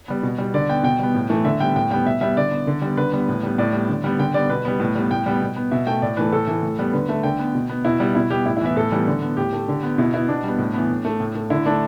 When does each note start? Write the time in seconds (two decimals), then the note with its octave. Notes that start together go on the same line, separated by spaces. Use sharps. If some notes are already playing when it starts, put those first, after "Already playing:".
0.08 G3 B3
0.23 B2
0.38 G3 B3
0.54 D3 D5
0.69 B3 G5
0.83 B2 G5
1.00 G3 B3
1.15 A2
1.29 E3 A3
1.44 D3 E5
1.60 G3 B3 G5
1.76 A2 G5
1.91 G3 B3 G5
2.05 B2 E5
2.21 G3 B3 E5
2.37 D3 D5
2.51 B3
2.67 D3
2.82 G3 B3
2.97 D3 B4
3.12 G3 B3
3.28 A2
3.43 G3 B3
3.58 A2 D5
3.73 G3 B3
3.89 D3
4.04 G3 B3
4.19 D3 G5
4.34 G3 B3 D5
4.50 B2 B4
4.65 G3 B3
4.80 A2
4.95 G3 B3
5.11 A2 G5
5.26 G3 B3
5.41 B2
5.56 B3
5.71 B2 E5
5.87 A3 G5
6.02 A2 D5
6.17 E3 A3 B4
6.32 A2 A4
6.47 E3 A3
6.63 A2
6.79 G3 B3
6.93 D3 B4
7.09 A3 E5
7.23 D3 G5
7.39 B3
7.55 B2
7.69 B3
7.85 B2 E4
8.00 G3 B3
8.15 B2 E4
8.30 G3 B3 G4
8.46 A2 E4
8.57 E4
8.61 E3 B3 E5
8.76 A2 A4
8.92 E3 G3 B3
9.07 D3
9.22 B3
9.37 A2 G4
9.53 A3
9.68 D3
9.83 B3
9.98 B2 E4
10.14 B3 E4
10.28 B2 D4
10.44 G3 B3
10.59 A2
10.74 E3 B3
10.90 A2
11.05 A3
11.20 A2
11.35 A3
11.50 D3 E4
11.66 A3 D4